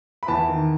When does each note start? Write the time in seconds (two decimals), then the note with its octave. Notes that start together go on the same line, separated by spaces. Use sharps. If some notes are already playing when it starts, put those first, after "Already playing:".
0.23 B5
0.28 E2 A5
0.49 D#3